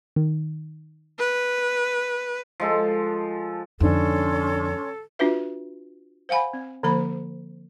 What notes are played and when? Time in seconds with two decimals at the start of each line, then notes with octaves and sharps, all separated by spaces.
0.16 D#3
1.19 B4
2.60 F3 G#3 A4
3.80 F2 G#2 D3 C#4 D4 A4 C#5 C6
5.19 D4 F4 F#4 B4 E5
6.29 C5 F5 F#5 G#5 B5
6.53 C4
6.83 D3 F3 A#3 C5 B5